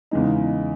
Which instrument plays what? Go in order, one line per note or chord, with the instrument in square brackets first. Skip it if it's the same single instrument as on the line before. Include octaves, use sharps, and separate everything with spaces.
[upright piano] E2 C#3 E3 G#3 D#4